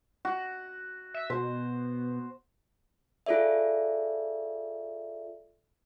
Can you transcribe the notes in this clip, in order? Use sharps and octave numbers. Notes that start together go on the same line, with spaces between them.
F#4
E5
B2 C5
F4 G#4 A4 D5 E5